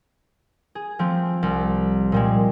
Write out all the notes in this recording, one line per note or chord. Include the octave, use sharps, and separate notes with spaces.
G#4
F3 A3 C4
C2
A#2 G3 G#3